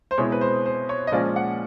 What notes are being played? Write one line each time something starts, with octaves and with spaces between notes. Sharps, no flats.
C5
B2 G#3 C4 E4 C#5
B4
C5
C5
C#5
D#5
A#2 F3 G#3 C#4 D5
F#5